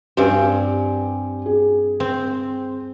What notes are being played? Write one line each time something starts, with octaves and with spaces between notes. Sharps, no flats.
G2 C4 G4 D5 G#5
G#4
C4